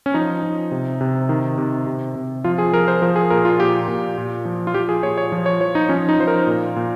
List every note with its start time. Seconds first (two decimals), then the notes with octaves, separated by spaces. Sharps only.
0.06 C#4
0.14 F3 D#4
0.43 F3
0.71 C3
1.01 C3
1.29 D#3
1.58 C3
1.87 C3
2.15 C3
2.44 F3 F4
2.58 G#4
2.73 F3 A#4
2.88 C5
3.02 F3 A#4
3.16 G#4
3.30 A#2 A#4
3.45 F4
3.59 A#2 G4
3.88 A#2
4.17 A#2
4.45 F3
4.67 F4
4.74 F3 G4
4.89 G#4
5.03 A#2 C#5
5.18 C#5
5.32 F3
5.46 C#5
5.60 F3 C#5
5.75 D#4
5.89 F3 C#4
6.09 D#4
6.19 F3 C5
6.27 A#4
6.47 A#2
6.76 A#2